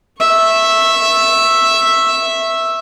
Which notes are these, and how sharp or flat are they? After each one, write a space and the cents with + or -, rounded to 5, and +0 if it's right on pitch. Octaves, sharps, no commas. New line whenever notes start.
E5 +0 C#6 -25